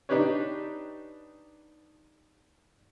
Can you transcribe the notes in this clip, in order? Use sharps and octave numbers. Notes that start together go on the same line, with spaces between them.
D4 D#4 G4 B4 C#5